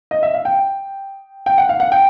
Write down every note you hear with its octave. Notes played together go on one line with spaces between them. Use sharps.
D#5
E5
F5
G5
G5
F#5
F5
F#5
G5